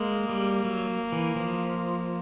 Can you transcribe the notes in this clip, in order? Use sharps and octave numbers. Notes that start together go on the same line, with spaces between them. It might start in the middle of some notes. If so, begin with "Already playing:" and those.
Already playing: G#3 A#3
G3
F#3
E3
F3